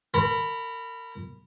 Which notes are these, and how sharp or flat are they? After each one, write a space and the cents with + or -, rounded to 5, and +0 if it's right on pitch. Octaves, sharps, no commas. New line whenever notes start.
A#4 -30 B5 +0